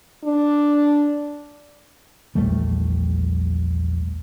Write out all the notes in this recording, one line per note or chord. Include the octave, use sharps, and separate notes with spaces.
D4
A#1 E2 G3 A3